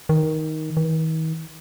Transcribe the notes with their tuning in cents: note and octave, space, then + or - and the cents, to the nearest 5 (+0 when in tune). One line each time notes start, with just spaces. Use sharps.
D#3 +10
D#3 +45